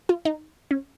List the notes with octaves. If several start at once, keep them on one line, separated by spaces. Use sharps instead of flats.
F4
D#4
C#4